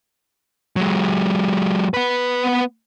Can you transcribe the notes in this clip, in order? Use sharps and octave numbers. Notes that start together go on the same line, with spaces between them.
F#3 G#3
B3 B4